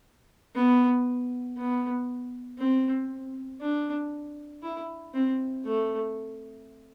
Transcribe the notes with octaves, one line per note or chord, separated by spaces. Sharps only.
B3
B3
C4
D4
E4
C4
A3